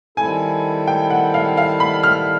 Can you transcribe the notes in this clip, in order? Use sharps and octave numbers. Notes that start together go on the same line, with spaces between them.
D#3 G3 C4 E4 A4 G#5
G5
F#5
F5
F5
B5
F6